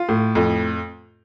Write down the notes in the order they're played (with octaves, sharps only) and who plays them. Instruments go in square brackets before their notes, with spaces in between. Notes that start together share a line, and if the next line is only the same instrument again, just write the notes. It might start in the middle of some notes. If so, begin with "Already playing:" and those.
Already playing: [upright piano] F4
A2
F2